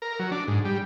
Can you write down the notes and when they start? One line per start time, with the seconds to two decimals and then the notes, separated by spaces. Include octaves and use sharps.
0.02 A#4
0.19 F#3
0.31 D4
0.48 G#2
0.65 G3